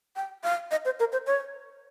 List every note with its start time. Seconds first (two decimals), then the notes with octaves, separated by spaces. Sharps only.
0.16 G5
0.44 F5
0.71 D#5
0.85 C5
1.00 A#4
1.12 C5
1.27 C#5